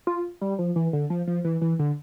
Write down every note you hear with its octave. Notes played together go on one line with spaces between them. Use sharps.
F4
G3
F3
E3
D3
F3
F3
E3
E3
D3